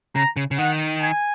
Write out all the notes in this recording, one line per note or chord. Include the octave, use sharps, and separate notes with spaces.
C#3 A#5
C#3
C#3
D#3 F#5
G#5